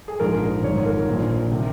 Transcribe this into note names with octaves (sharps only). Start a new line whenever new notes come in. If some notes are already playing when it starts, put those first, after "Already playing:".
G#4
A#1 G#2 F3 A#4
G#1 G#2 F3 C#5
A#4
A#1 A#2 F3
C3 D#3